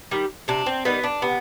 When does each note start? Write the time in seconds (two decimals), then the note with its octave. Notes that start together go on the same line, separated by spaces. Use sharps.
0.11 D#3 G3
0.48 C3 D4
0.66 C4
0.85 D#3 G3 B3
1.04 D4
1.22 C3 B3